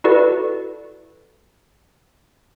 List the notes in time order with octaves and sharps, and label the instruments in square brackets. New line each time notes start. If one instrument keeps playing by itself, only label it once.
[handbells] E4 F#4 A4 B4 D5